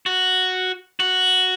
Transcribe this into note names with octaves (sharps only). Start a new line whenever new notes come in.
F#4
F#4